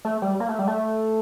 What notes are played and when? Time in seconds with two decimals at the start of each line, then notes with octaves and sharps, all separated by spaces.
0.05 A3
0.22 G3
0.40 A#3
0.48 A3
0.59 G3
0.67 A3